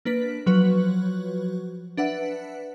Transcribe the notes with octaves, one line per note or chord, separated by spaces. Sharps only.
A#3 D4 B4 B6
F3 F#3 F#4 B4
D4 B4 E5 F#5